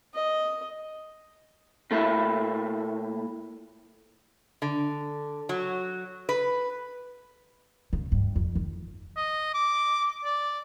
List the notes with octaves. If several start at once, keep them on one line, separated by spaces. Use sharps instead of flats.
D#5
A#2 A3 A#3 E4
D3
F#3
B4
C#3
G2
F2
D#3
D#5
D6
D5